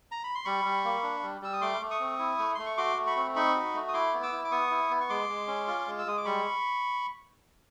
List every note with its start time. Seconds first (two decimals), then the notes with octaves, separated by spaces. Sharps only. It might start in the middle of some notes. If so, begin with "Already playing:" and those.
0.12 A#5
0.24 B5
0.35 C6
0.45 G3 B5 C#6
0.65 G3
0.85 A#3
1.03 D4
1.23 G3
1.42 G3 E6
1.53 D#6
1.61 A3 C6 D6
1.81 A3
1.91 C#6 D#6
2.00 C4
2.19 E4
2.39 A3
2.55 A3 C6
2.66 C#6
2.77 F#4 C6 D6
2.97 A3
3.06 B5 C#6
3.16 C4
3.36 D#4 B5 C#6
3.55 F#4
3.74 A3
3.88 D#6
3.93 E4 C6 D6
4.13 B3
4.23 D6 E6
4.32 E4
4.45 D6
4.51 B3 C#6 D#6
4.71 E4
4.90 B3
5.01 C#6
5.09 G#3 C6 D6
5.29 G#3
5.48 C#4
5.68 F4
5.87 G#3
5.99 E6
6.06 G#3 D#6
6.17 D6
6.25 G3 B5 C#6